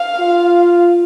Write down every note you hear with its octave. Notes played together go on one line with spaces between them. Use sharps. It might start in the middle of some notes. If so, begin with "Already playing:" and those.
Already playing: F5
F4